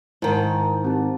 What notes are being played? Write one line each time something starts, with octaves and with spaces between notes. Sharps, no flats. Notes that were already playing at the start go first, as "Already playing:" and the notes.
G#2 D#3 E4 A5
C4 G4 A5